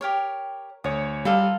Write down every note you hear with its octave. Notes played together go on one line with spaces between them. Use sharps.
G4 A#4 C#5
D2 C#5 D#6
G3 F4 A4 A#4